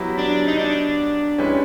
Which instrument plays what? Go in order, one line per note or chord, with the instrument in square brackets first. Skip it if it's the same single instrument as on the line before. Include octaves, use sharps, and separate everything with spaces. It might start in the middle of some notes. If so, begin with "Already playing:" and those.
Already playing: [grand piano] F#3 B3 E4 G4 B4
[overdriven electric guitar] D4
D#4
D4
[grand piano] G#3 C#4 E4 G4 B4